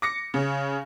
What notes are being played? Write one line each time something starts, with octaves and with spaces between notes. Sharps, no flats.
D6 A#6 C#7
C#3